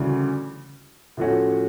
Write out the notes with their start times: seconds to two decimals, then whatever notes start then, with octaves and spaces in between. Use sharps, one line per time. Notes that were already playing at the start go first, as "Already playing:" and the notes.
Already playing: D2 C#3 E3 G3
1.17 A2 F3 A3 C#4 F#4